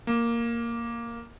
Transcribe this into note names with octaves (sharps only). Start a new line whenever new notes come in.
A#3